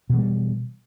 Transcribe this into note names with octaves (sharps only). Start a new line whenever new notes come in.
B2 E3 G3